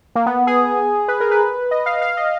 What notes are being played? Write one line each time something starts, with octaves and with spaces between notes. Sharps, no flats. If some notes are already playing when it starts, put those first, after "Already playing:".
A#3
B3
G#4
B4
A#4
B4
D#5
F5
F5
D#5